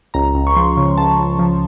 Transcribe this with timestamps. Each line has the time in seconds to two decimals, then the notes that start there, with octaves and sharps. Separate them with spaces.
0.14 C#2 A#5
0.35 C#2
0.47 C#6
0.56 F3 C6
0.77 C#3
0.98 C#2 A5
1.19 C#2
1.39 F3